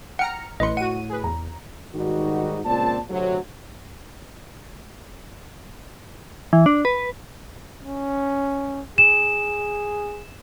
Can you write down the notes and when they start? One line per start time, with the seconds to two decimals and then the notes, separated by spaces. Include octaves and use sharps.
0.19 F#5 G5 A#5 F6 C#7
0.60 A1 A2 B4 D#5 C6 C#7
0.77 F#4 F#5 D#7
1.10 G#4 B4
1.24 E2 A#5
1.94 G#2 D#3 G3 D#4 F#4
2.64 C#2 A#2 C4 D5 A5
3.09 D2 C3 F#3
6.53 E3
6.66 D4
6.85 B4
7.84 C#4
8.98 G#4 E7